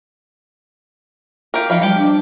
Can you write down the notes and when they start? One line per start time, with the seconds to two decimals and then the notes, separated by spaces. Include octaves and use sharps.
1.54 F4 G4 A#4
1.70 D#3 F3 F5 B5
1.82 F3 G3 G4
1.98 D4